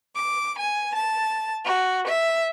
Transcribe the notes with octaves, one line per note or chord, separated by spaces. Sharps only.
D6
G#5
A5
F#4
E5